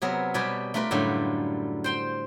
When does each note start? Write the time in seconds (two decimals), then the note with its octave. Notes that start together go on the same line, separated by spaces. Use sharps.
0.02 C3 F#3 B3 G#4 A#4
0.34 B2 G3 B4 D5 G#5 A#5
0.74 A3 F4 A#4 B4 D5
0.91 F#2 A2 D3 G3 A3 F4
1.84 C5 G5 C6